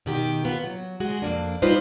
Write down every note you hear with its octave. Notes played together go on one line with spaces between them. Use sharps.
B2 D#3 G4
B3 F4
F#3
G#3 F#4 G#4
F2 A#3 D4
G3 D#4 F4 B4 C5